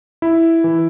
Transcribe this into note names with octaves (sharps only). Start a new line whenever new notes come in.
E4
E3